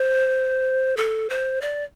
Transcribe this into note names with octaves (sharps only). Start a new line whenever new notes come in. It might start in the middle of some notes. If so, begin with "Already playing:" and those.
Already playing: C5
A4
C5
D5